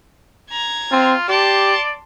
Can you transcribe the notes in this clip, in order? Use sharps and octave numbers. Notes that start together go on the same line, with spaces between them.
A#5 G#6
C4 F4
G4 D5 A5 C6